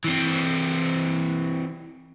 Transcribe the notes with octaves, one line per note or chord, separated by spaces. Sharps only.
E3 C4